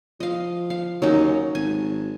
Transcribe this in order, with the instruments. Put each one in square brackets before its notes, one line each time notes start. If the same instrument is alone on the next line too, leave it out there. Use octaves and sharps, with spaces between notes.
[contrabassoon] F3 [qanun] D#5 F5
[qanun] F5
[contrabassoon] D#2 [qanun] F#3 C#4 D#4
[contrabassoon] G#1 [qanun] G#5